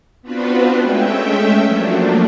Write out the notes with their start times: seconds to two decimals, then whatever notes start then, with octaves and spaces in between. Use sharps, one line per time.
0.22 B3 C4 D4 F4 F#4 B4
0.80 G#3 A3 C#4 E5 G5
1.64 F3 F#3 A3 A#3 D4